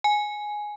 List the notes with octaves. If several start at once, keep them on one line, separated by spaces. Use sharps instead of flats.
G#5